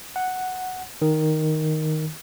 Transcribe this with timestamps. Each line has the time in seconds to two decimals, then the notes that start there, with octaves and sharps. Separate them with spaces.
0.16 F#5
1.02 D#3